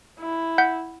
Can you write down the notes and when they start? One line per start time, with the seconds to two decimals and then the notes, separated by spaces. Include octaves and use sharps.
0.20 E4
0.58 F#5 G6 B6